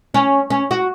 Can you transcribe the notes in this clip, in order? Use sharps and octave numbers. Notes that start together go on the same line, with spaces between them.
C#4
C#4
F#4